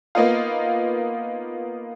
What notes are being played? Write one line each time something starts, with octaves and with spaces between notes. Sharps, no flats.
A#3 B3 D#4 F4